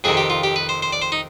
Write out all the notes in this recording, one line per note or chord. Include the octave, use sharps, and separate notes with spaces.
F2 C3 D#3 G#4
G4
F4
G4
B4
C5
C5
D5
C5
D#4